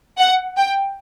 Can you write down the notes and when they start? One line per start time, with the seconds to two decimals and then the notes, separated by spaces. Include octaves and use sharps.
0.18 F#5
0.57 G5